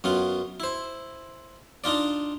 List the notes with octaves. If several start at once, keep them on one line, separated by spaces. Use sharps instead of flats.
F#2 B3 F4
E4 C5
D4 D#4 F4 D5